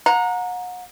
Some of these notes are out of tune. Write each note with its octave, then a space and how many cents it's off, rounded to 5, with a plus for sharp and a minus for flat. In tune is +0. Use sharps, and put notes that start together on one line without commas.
F#5 -35 A#5 +0